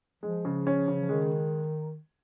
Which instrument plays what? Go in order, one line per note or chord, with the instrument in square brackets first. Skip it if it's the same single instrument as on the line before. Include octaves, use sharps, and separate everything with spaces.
[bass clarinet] F3 [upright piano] G#3
[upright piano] C#3
C#4
C#3
[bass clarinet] F3
[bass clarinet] D#3 [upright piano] G#3